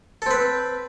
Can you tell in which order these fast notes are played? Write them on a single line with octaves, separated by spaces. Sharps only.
A4 C4 B4